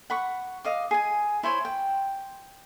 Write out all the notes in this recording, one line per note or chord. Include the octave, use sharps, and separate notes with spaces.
F#5 B5 C#6
D#5 F5 D6
G#4 G#5
E4 C5 C#5 G#5
G5